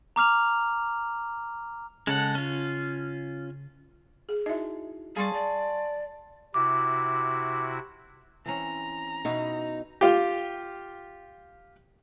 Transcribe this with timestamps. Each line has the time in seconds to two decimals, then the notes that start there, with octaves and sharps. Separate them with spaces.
0.16 A#5 D6 F6 F7
2.07 C#3 G#3 A4 F#5
2.35 C#4 F4
4.29 G#4
4.46 D#4 E4 F#4 D#5 E5
5.16 G3 G#4 F5 A5 C6 C#6
5.33 D5
6.54 C3 E4 F#4 D6
8.46 E3 C4 C#4 A#5
9.25 B2 D#4 E4 F#4
10.01 F4 G4